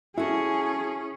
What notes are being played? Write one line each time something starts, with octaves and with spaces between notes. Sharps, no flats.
C#4 E4 F#4 G#4 A4 E5